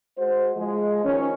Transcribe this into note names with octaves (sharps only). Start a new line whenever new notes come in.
G#3 F#4 C5
F3 G#3
D#3 F3 C#4